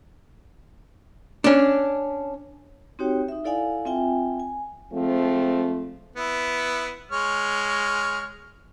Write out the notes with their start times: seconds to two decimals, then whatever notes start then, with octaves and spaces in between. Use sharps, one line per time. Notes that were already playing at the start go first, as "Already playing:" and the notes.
1.44 C#4 D4
2.99 C4 D#4 F#4 G4 C#5 G5
3.28 D#4 E5
3.44 E4 A4 D5 F5 F#5 G#5
3.86 C4 F4 E5 G5 G#5
4.40 G#5
4.93 F3 G#3 A3 C4
6.16 B3 E4
7.12 G#3 C#5 F6